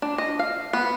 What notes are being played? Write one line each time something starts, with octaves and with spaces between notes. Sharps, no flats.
D4
D#5
F5
B3